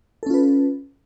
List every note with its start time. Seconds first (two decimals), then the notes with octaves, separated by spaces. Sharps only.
0.23 A4
0.26 C#4
0.30 F4
0.34 B4